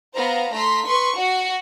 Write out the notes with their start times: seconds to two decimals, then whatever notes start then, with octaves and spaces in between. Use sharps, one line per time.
0.16 B3 C5 F5 A#5
0.54 A3 A#5 C6 B6
0.86 B4 C6 C#6
1.19 F#4 F#5